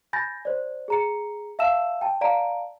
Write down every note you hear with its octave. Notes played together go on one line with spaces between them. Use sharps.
G#5 B5 G6 A6 A#6
C5 D5
G#4 A#5 C#7
E5 F5 A5 E6 E7
G5 A5
D5 F5 A5 A#5 D7